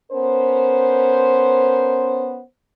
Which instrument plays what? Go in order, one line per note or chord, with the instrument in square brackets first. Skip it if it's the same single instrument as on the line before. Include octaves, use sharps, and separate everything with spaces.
[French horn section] B3 C#4 A#4 C5